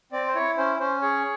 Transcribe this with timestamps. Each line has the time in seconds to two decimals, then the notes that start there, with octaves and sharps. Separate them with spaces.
0.12 C4 D5
0.27 C5
0.35 E4 C#5
0.57 C#4 C5
0.80 C#4 C5
1.02 G#4 C#5